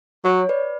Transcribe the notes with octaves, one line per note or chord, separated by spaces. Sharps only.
F#3 C#5
B4 D5